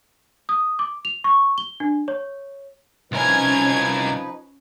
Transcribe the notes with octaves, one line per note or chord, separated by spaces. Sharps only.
D#6
D6
F7
C#6
G7
D4
C#5
C2 F3 C#4 D#4 A#4 B4 G#6